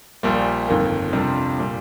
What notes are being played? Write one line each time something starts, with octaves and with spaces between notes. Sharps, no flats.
A#1 A#2 G3
G1 F2 D#3 A#3
F2 C3 G3 D4 F4
A#2 G3